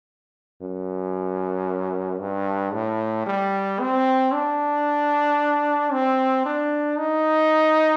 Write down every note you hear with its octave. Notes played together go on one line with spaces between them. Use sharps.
F#2
G2
A2
G3
C4
D4
C4
D4
D#4